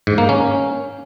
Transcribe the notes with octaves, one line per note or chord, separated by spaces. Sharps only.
G#2
A#3
C#4